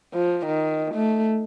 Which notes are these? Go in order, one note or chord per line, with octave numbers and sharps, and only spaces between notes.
F3
D#3
A3